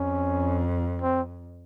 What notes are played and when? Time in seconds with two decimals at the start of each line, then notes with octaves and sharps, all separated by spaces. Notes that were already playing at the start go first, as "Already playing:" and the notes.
Already playing: F2 C#4
1.02 C4